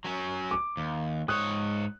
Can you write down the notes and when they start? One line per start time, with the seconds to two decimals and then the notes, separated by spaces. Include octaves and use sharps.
0.04 F#3 C#4
0.51 D6
0.77 D#2
1.28 G#2 C#5 D#6 F#6